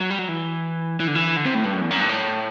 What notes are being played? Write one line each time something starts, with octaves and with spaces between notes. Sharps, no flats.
F#3
G3
F#3
E3
E3
D3
E3
D3
C3
A2
G2
F#2
E2
F#2
G2
A2